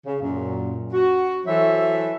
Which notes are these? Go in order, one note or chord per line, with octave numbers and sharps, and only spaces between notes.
C#3
F#2 A#2
F#4
E3 F#3 A4 C5 E5